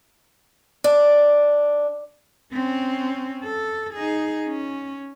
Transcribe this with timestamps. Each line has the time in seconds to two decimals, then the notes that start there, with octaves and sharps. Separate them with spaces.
0.84 D4
2.52 C4 C#4
3.43 A4
3.94 D#4 G#4
4.48 C#4